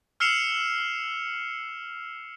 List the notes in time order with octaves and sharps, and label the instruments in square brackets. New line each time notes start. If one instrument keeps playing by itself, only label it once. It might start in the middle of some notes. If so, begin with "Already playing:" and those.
[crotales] E6 F6 C7 C#7 E7 F7